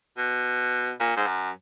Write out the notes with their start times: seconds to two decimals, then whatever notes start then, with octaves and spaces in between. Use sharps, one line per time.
0.18 B2
1.00 A#2
1.17 G#2
1.27 F#2